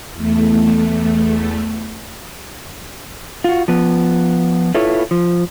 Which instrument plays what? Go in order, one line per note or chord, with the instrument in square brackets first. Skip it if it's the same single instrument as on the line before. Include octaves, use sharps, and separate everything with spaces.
[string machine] E2 A3
[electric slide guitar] F4 F#4
F3 B3
E4 F4 A4 B4 C#5
F3